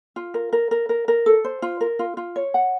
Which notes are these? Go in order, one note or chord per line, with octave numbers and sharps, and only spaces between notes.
F4
A#4
A#4
A#4
A#4
A#4
A4
C5
F4
A#4
F4
F4
C#5
F#5